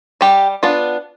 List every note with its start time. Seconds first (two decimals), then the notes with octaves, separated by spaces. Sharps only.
0.21 G3 G4
0.63 B3 D4 F4